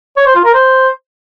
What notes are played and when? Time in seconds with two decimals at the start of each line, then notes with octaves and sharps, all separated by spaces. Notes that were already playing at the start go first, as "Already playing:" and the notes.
0.17 C#5
0.26 C5
0.35 F4
0.45 A#4
0.54 C5